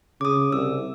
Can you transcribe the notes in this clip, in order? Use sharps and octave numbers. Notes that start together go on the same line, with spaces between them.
C#3 D6 D#6
C2 E6